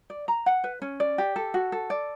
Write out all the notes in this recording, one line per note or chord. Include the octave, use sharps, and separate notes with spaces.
D5
A#5
F#5
B4
C#4
D5
G4
A4
F#4
A4
D5